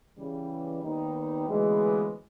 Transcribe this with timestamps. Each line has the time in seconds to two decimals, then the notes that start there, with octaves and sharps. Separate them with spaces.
0.17 C#3 E3 G3
0.82 D#2 D#3 G3 B3 D#4
1.47 D2 C#3 E3 G#3 B3